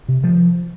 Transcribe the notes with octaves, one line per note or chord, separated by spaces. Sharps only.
C3
F3